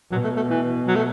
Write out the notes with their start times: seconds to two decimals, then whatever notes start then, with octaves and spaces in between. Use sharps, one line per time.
0.11 B2 F#3
0.24 A3
0.36 A3
0.49 E3
0.87 F#3
0.95 A3